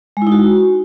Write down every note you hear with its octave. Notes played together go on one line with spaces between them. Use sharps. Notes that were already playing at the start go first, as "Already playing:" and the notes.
G#3
E4
D#4
F#4